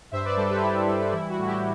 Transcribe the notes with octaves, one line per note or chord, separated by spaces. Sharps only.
G2 C5 E5
B4 D5
G3 A4 C5
G4 B4
G2 E4 G4
G3
E3 E4
F#4
A2
E4 G4